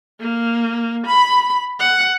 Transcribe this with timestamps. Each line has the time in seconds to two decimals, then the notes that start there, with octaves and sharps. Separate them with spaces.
0.20 A#3
1.06 B5
1.80 F#5